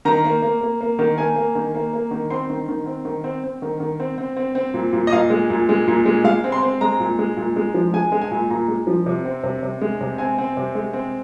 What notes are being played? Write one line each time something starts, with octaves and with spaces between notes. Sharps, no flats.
D#3 A#5
A#3
A#3
A#3
A#3
D#3
A#3 G#5
A#3
D#3
A#3
A#3
D#3
C4 C6
D#3
D#3
C4
D#3
C4
C4
D#3
D#3
C4
C4
C4
C4
A#2
A#2
D#5
A#2 F5
G#3
A#2
G#3
A#2
G#3
G#3 F5
C4
C6
C4
G#3 A#5
A#2
G#3
A#2
G#3
F3
G#3 G#5
G#3
G#5
A#2
A#2 A#5
G#3
F3
C3
C4
C3
C3
G#3
C3
C4 G#5
C4
C3
G#3
C4